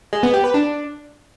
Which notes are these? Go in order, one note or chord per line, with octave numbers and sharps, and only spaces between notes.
G#3
B3
G4
B4
D4